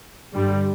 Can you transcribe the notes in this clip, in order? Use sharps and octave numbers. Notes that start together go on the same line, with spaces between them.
G2 D3 G3